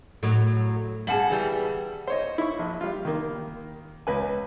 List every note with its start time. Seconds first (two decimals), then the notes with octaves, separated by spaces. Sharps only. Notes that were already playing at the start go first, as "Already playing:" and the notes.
0.23 A2 F#3
1.07 G3 G#4 F#5 A5 F#7
1.30 E3 G3 B3
2.07 C5 C#5 D#5
2.38 E4 C#6
2.59 A#1
2.81 G3 F4
3.05 D#3 A#3
4.07 C#2 B4 G#5